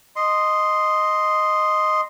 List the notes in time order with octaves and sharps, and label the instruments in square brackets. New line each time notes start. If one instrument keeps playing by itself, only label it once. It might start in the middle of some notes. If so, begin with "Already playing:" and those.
[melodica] D#5 C6